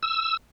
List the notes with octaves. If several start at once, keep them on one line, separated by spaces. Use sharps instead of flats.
E6